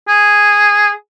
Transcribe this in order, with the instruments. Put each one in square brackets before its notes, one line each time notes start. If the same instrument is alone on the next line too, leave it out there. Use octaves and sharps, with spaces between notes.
[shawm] G#4